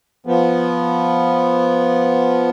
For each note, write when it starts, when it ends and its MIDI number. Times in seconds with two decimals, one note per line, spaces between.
0.26 2.50 53
0.26 2.50 59